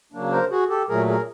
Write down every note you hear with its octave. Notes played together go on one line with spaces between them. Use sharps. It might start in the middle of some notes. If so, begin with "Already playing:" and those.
C#3 F#3 A#3 D4
A#4 C5
F#4 G#4
G4 A4
A#2 F#3 A3 G#4 A#4
G#4 A#4